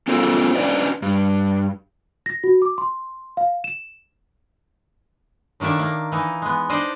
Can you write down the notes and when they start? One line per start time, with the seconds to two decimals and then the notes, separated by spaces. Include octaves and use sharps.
0.08 B3 C#4 F4 A4 C5
0.55 C#4 D4 B4 D5 D#5
1.02 G2
2.26 A#6
2.44 F#4
2.62 D6
2.78 C6
3.37 F5
3.64 E7
5.60 A2 D#3 A#3 D4 E5
5.79 A#3
6.12 E3 D#4
6.42 G#3 B3
6.69 D4 D#4 C5 D5 D#5